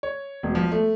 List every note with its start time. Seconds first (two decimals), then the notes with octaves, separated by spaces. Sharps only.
0.03 C#5
0.43 E1
0.55 F3
0.72 A3